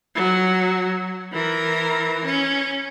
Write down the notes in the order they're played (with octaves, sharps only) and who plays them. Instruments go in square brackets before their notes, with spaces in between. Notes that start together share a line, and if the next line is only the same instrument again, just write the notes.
[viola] F#3
E3 A#4
C#4